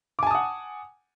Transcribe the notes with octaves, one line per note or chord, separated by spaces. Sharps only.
F#5 G#5 A5 D6 D#6